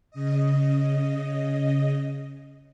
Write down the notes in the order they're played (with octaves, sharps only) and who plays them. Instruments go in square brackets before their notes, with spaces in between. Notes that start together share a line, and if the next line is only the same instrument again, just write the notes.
[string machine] C#3 D#5